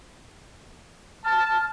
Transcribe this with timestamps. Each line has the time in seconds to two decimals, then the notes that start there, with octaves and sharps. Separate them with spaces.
1.24 A5 F6